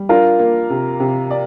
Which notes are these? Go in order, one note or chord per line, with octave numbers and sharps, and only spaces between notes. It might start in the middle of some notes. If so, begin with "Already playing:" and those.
Already playing: G3
D4 F4 A#4
A#3
C3
C3
D5